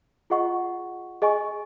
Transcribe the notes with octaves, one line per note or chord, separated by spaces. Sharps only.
F4 G#4 D#5 F#5 C#6
G#4 D#5 G#5 C#6